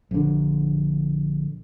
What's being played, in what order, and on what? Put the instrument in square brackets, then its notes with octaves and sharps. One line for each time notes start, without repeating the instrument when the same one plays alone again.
[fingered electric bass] A#1 D3